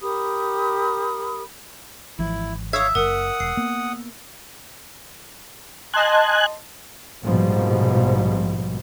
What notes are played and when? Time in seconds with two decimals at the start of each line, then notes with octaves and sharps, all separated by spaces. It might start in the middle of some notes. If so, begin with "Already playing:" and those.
0.01 G4 A#4 B5 D#6
2.19 G#1 E3 F3 E4
2.73 C#5 E5 F5 D#6 G#6
2.95 F#1 A#4 F#5 D#6
3.40 E1 C7
3.57 A#3 B3
5.94 D#5 G#5 A5 C6 F#6
7.23 A#1 G#2 B2 F3 G3